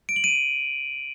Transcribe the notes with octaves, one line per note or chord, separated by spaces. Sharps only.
D7
F#7
D#7